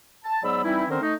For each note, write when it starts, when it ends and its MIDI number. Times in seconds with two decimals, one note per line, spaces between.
0.24 0.42 81
0.43 0.61 44
0.43 0.61 54
0.43 0.61 59
0.43 0.61 74
0.43 0.61 83
0.43 0.61 88
0.64 0.85 52
0.64 0.85 55
0.64 0.85 60
0.64 0.85 63
0.64 0.85 64
0.89 1.00 50
0.89 1.00 51
0.89 1.00 60
0.89 1.00 61
0.89 1.00 70
0.89 1.00 72
1.01 1.14 57
1.01 1.14 63